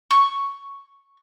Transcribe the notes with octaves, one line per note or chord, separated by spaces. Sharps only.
C#6